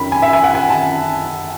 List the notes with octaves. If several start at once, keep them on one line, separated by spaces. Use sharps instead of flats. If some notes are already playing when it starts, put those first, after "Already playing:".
Already playing: F#2 D#3 B5
G#5
E5
G#5
F#5
G#5
A5